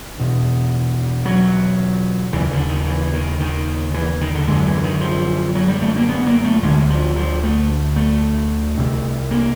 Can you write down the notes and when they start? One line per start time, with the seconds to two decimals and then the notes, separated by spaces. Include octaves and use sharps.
0.18 E2 B2
1.25 F#3
2.33 D#2 C#3 E3
2.51 D3
2.69 D#3
2.87 E3
3.13 D#3
3.40 D#3
3.94 E3
4.21 D#3
4.35 D3
4.48 F#2 D3 G#3
4.65 E3
4.84 D#3
5.01 F3
5.55 F#3
5.68 G3
5.82 A3
5.96 A#3
6.09 B3
6.27 A#3
6.45 A3
6.62 D2 D3 G#3
6.90 F3
7.16 F3
7.44 A3
7.96 A3
8.78 C2 C3
9.31 A#3